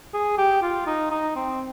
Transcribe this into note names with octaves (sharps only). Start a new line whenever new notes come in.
G#4
G4
F4
D#4
D#4
C4